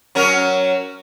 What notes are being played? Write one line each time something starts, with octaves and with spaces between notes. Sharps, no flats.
F#3 C#4 A#4